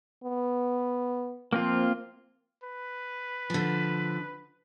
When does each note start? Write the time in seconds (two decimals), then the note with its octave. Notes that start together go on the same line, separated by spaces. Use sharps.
0.24 B3
1.53 F3 A#3 C4 F4
2.63 B4
3.50 D3 F3